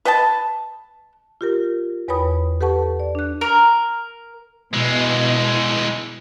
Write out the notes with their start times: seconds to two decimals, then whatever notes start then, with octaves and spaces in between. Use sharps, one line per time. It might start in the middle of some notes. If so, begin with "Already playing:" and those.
0.05 B4 D#5 G5 A5
1.41 F4 G4 A#4
2.08 E2 B4 C#5 G5 B5 D#6
2.61 G4 A4 B4 F#5 A5 C#6
3.00 D5
3.15 D4 F#6
3.41 A#4
4.74 B2 E3 G#3